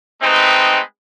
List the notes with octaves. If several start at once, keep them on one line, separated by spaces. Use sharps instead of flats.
G#3 A3 C4 D#4 B4 G5